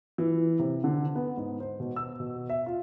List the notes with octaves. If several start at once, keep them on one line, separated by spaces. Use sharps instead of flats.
E3
C3
D3
B3
G#2
C5
B2
E6
B2
E5
F4